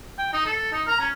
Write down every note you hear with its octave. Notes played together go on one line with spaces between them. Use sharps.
G5
D#4
A4
D#4
A#5
C#4